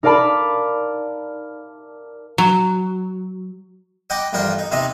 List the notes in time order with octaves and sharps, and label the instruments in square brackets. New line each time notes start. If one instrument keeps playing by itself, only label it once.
[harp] D#4 A#4 D5 F5 A5 B5
[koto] F#3
[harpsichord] D#5 F#5 G5 A#5 B5 D6
A1 G2 F3 A#4 F#5 G5
D#4
D#2 C3 C4 D#4 B4 D#5